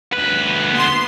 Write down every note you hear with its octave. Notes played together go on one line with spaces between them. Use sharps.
D2 B4
B3 C6